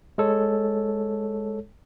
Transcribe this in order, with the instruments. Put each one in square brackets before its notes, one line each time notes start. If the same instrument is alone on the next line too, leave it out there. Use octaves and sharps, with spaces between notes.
[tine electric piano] G#3 A4 C#5